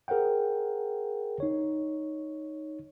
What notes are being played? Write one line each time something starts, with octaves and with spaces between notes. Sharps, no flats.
G#4 A#4 C5 F#5 G5
D#4 C#5